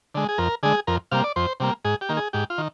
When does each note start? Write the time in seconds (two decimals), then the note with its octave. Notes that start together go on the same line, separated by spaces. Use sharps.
0.15 D3 G#3
0.29 G#4
0.38 F2 A#4
0.63 D3 G#3 G#4
0.87 F2 A#4
1.11 C3 G3 A#3 F5
1.24 D5
1.36 F2 C5
1.60 C3 G3 A#3
1.85 G#2 G#4
2.01 G4
2.09 D#3 A#3
2.17 G#4
2.33 G#2 G4
2.50 F4
2.58 D#3